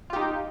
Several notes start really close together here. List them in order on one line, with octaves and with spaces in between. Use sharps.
F4 G4 D#4